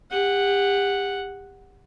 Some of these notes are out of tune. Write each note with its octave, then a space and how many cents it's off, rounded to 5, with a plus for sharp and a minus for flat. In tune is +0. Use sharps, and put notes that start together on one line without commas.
G4 +35 F#5 +0